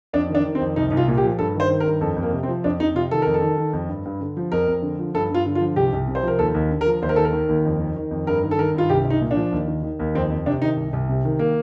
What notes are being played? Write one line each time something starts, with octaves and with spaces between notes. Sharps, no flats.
F2 D4
D#3
D4
D#3
C4
F2
C2 D#4
C2 D#4
F4
A#2
G4
F3
G2 A4
D#3 C5
D#3
A#4
G2
F2 A4
F2
A#3
C3
C4
F3
F2 D4
F2 D#4
C3 F4
D#3 A4
F2 A#4
A4
D#3
D#3
F2
G2
G2
D3
F3
F2 A#4
F2
D3
F3
G2 A4
G2 F4
D3
F4
F3
C2 G4
C2
C3
C5
F3 A#4
D#2 A4
D#2
D3
A#4
F3
D#2 C5
A#4
D#3 A4
A#4
D#3
D#2
F2
D#3
D#3
F2
G2 A#4
D#3
A4
D#3 A#4
G2 F4
C2 G4
C2
D#4
A#2
D4
F3
D#2
D#3
D#3
D#2
F2 C4
F2
C3 D4
D#3 D#4
C2
C2
C3
D#3
A#3